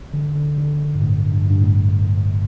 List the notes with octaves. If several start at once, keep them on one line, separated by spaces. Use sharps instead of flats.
D3
D3
D3
G2
A2
G2
G2
A2